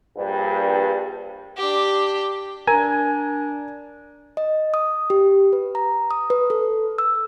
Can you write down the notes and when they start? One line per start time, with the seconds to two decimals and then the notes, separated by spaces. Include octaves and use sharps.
0.16 A#1 G2
1.57 D4 G4
2.67 D4 A#4 G#5 A#5 G#6
4.37 D#5
4.74 D#6
5.10 G4
5.53 B4
5.75 A#5
6.11 D#6
6.30 B4
6.50 A4
6.98 E6